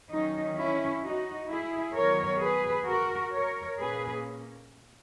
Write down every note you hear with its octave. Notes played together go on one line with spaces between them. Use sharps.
D#3 F#3 C#4 D#4
C#4 E4
D#4 F#4
E4 G#4
D#3 F#3 B3 A#4 C#5
G#4 B4
F#4 A#4
A#4 C#5
A#2 A#3 C#4 G#4 B4